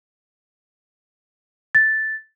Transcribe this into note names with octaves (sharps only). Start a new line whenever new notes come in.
A6